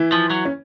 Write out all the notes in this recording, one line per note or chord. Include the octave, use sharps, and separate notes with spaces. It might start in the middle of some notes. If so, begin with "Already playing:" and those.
Already playing: E3 E4
F3
F#3
C#4